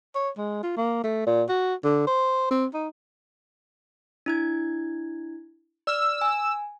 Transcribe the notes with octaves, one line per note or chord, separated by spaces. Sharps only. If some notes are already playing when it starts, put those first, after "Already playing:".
C#5
G#3
F4
A#3
A3
A#2
F#4
D3
C5
C4
D#4
D4 E4 G#6
D5 E6 F6
G#5